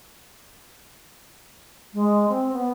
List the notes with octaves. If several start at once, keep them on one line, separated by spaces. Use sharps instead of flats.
G#3
C4
B3